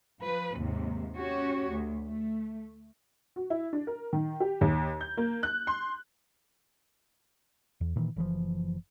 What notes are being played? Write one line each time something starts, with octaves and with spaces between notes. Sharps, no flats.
F3 B4
D#2 G#2 C3
C#4 F#4 G4 C#5
D2
A3
F#4
E4
D4
A#4
D#3
G4
D#2
G6
A#3
F#6
C6
E2
A#2 D#3 E3
F#1 E3 F3